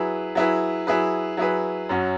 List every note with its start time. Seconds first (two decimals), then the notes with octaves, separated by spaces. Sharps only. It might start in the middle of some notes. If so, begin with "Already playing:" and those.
Already playing: F#3 E4 G#4 B4
0.35 F#3 E4 G#4 B4
0.87 F#3 E4 G#4 B4
1.37 F#3 E4 G#4 B4
1.89 F#2 F#3 C#4 F#4